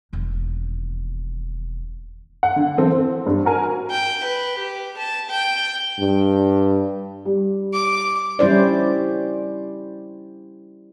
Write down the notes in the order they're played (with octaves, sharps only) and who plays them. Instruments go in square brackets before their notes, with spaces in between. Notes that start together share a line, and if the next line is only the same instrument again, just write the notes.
[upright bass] E1 D#2
[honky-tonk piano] F#5
D3
E3 C4 A4
C4
G2
F#4 A#4 G#5
[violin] G5
B4
G4
A5
G5
[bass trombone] G2
[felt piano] G3
[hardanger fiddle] D6
[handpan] G3 C#4 E4 C5 D5